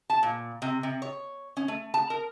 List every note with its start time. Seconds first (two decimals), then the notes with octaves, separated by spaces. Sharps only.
0.10 A5
0.23 A#2
0.62 C3
0.83 C3
1.02 C#5
1.57 C#4
1.68 A3
1.94 A5
2.10 A#4